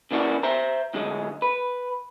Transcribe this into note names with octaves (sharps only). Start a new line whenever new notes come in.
C#3 E3 A#3 D4 F#4
C5 E5 A#5
A2 D3 F#3 G#3
B4